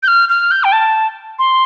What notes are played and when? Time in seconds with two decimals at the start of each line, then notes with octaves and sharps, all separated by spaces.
0.03 G6
0.08 F6
0.29 F6
0.51 G6
0.64 G5
0.72 A5
1.39 C6